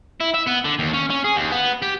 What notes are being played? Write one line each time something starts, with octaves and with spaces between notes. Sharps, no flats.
E4
E5
B3
D3
D#2
C#4
C#4
G#4
D#2
B3
G4